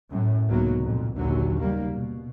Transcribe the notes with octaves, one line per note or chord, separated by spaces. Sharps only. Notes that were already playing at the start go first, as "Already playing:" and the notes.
F#2 A2 A3
C#2 C3 D#3 F#3 A#3 B3
F2 A#2
A#1 D#2 D3 F#3
F#1 D#3 G3 A#3
B2